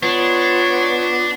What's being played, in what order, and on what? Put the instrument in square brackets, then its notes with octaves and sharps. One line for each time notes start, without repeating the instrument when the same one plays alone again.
[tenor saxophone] B3 [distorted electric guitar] D4 [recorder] F4 [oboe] C#5